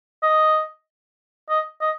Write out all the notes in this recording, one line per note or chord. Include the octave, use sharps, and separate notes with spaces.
D#5
D#5
D#5